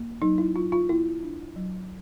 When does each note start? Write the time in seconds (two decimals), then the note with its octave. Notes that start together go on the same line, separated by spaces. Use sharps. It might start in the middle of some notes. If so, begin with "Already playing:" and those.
Already playing: A#3
0.22 F#3 D#4
0.38 E4
0.55 F#3 F4
0.72 F4
0.89 B3 E4
1.23 D4
1.56 F#3